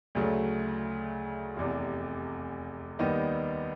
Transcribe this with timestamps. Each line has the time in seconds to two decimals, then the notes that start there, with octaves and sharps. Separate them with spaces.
0.15 D2 C#3 F#3 A3
1.57 F1 E2 C3
2.99 D#2 D#3 G3 B3 D#4